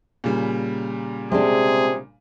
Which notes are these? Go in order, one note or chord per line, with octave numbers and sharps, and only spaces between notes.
A#2 C#3 G3
C3 G#3 C4 D4 G#4